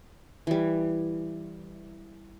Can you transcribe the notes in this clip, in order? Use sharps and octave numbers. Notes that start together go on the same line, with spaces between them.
E3 G3